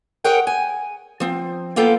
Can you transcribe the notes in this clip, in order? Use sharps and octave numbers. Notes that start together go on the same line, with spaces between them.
G#4 A#4 C#5 F#5 G5
G#5
F3 C4
A#3 B3 F4 A4 G5